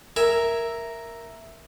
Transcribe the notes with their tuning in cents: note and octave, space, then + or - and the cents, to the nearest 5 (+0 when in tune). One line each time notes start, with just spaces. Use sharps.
A#4 +0 E5 +0 G#5 +0